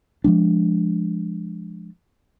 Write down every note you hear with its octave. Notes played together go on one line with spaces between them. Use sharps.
F3 G#3 D4